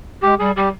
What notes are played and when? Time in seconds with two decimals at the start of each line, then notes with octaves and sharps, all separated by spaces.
0.23 G#3 G4
0.39 G3 G#4
0.56 G3 G4